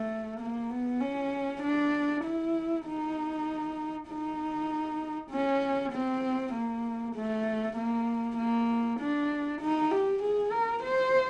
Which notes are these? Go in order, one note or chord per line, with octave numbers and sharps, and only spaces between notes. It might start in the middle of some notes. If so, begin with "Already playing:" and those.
Already playing: A3
A#3
B3
C#4
D4
E4
D#4
D#4
C#4
C4
A#3
A3
A#3
A#3
D4
D#4
G4
G#4
A#4
C5